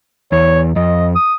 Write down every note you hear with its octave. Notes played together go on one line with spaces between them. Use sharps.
E2 C#5
F2 D#5
D#6